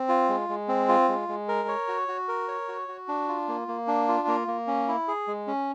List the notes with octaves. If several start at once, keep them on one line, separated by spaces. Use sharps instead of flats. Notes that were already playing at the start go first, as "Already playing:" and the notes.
Already playing: C4
F4
G#3
G#3
C4
F4
G#3
G#3
A#4
C#5
F#4
F#4
A#4
C#5
F#4
F#4
D4
F4
A#3
A#3
D4
F4
A#3
A#3
C#4
E4
G#4
G#3
C#4